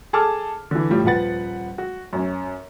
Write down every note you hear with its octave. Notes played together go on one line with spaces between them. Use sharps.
G#4 A4 A5 D6 F6
D3 E3
A2 F3 G3
D#1 F3 B4 F#5 A6
F#4
F#2 C#4